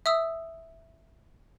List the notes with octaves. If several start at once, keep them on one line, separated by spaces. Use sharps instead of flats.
E5 D#6 E6